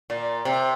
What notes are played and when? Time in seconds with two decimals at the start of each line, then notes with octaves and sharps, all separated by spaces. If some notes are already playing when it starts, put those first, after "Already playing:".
0.10 A#2
0.45 C3